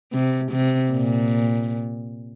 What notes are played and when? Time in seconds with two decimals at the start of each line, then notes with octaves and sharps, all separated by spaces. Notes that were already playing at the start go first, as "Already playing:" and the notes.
0.12 C3
0.52 C3
0.91 A#2